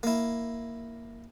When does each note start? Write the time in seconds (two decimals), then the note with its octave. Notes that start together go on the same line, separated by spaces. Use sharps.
0.03 A#3 E4